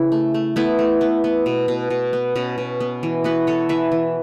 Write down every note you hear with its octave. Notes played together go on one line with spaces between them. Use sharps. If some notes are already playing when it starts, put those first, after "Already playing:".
Already playing: C#3 E4 B4
A3
A3
A3 B3 E4
A3
B3
B3
B2
B2
B2
B3
B2 C#4
B2
B3
E3
B3 F#4 B4
B3 A4 C#5
E3 B4 E5
E3